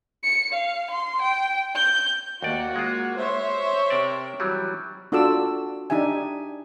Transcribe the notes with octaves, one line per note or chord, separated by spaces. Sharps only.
C#7
F5
C6
G5
G6
D#2 A#3 F#4 D5
G#3 F4
C5 C#5 E5
C3 A#4 D5
E3 F#3 G3
D4 F4 F#4 A4 D6 E6
D4 D#4 G4 E5 G#5